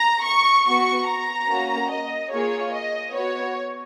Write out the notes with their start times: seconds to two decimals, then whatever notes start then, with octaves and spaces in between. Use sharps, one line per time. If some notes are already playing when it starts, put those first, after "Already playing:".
Already playing: A#5
0.23 C#6
0.65 B3 F#4 C#6
1.06 A#5
1.48 A#3 C#4 F#4
1.89 D#5
2.31 A#3 F4 G#4 C#5
2.72 D#5
3.13 B3 F#4 C#5